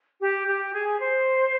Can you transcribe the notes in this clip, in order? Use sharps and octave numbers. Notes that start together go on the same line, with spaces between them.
G4
G4
G#4
C5